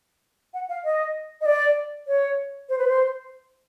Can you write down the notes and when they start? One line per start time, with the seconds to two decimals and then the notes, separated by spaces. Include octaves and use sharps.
0.54 F#5
0.69 F5
0.84 D#5
1.41 D#5
1.46 D5
2.08 C#5
2.69 C5
2.78 B4
2.87 C5